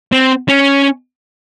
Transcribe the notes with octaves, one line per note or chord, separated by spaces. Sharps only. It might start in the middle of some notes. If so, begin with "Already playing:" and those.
C4
C#4